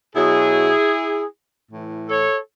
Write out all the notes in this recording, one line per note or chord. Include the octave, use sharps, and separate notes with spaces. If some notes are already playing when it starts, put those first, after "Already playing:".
B2 F#3 E4 G#4
A2 E3
A4 C#5